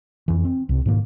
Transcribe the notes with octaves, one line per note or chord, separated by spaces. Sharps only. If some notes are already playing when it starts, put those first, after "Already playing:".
F2 E3
C4
C2 C3
G#2 B2 D#3 A#3